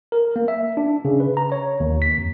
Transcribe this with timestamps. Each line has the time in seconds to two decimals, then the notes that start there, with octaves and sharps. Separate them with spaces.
0.12 A#4
0.36 A#3
0.48 E5
0.77 D4
1.05 C#3
1.20 B4
1.37 A#5
1.52 C#5
1.80 D#2
2.02 B6
2.18 F2